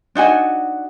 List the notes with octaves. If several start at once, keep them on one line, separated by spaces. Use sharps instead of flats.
D4 D#4 F#4 G#5